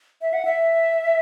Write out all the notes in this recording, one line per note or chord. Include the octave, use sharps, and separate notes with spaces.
E5
F#5
E5